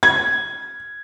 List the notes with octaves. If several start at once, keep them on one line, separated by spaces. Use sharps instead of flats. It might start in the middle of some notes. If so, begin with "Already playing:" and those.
G#6